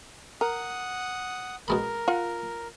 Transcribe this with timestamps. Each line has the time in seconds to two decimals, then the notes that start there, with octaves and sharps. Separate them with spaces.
0.41 A#4 F#5 D#6
1.68 B2 G#3 A#4 B5
2.08 F4 F#5